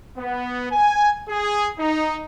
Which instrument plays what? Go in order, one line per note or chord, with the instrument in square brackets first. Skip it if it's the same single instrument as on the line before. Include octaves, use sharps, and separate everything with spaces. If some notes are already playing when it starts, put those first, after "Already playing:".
[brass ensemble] B3
G#5
G#4
D#4